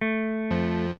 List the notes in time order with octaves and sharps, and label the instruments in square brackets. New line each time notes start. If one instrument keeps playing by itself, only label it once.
[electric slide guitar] A3
[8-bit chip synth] F2 F3